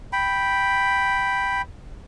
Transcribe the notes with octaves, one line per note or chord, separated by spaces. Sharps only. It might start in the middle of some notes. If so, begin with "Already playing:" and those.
G5 B5